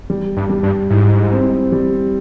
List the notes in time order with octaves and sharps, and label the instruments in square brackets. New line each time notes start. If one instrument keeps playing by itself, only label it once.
[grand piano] G3
[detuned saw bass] G2
[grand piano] G3
[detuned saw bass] G2
[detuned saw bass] G#2 [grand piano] E4
[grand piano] C4
G3